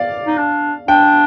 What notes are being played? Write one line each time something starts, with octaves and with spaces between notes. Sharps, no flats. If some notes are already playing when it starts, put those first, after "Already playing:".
Already playing: D5 F5
D#4
D4
D4 G5